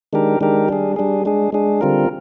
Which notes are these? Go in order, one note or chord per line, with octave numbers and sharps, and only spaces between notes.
D#3 G#3 D4 G4 A#4
D#3 G#3 D4 G4 A#4
G3 D4 G#4
G3 D4 G#4
G#3 D4 G#4
G#3 D4 G#4
D3 G3 C4 F4 A#4